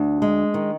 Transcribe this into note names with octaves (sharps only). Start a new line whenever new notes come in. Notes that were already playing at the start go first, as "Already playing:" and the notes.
Already playing: D2 D4
G#3
D#3